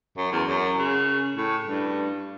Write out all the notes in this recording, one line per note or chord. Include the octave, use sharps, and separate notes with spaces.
F#2
E2
F#2
C#3
A2
G2